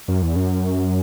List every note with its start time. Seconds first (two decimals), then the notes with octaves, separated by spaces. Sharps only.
0.08 F#2
0.22 E2
0.36 F#2